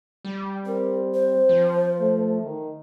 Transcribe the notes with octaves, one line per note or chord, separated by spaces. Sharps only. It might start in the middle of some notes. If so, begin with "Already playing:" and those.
G3
C4 A#4
C5
F3
A3
D#3